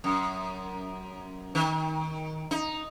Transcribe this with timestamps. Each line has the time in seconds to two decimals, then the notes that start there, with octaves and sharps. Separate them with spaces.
0.04 F#2
1.55 D#3
2.51 D#4